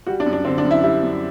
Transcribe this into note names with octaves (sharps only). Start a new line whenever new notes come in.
G3 F#4
D4
F#2
D4
D3 C4
D4
F#2
E4
G3 E4
F#2